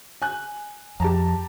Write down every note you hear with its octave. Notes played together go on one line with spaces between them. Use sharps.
G#5 F#6
F2 G4 A5 A#5